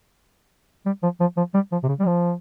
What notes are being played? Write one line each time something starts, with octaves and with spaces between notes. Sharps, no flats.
G3
F3
F3
F3
G3
F3
C3
C#3
G3
F3